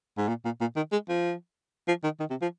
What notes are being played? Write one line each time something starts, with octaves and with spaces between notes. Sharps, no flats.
G#2
A#2
A#2
A#2
D#3
G#3
F3
F3
D#3
D#3
C3
F3